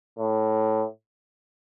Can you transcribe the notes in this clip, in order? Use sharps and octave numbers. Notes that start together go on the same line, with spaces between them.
A2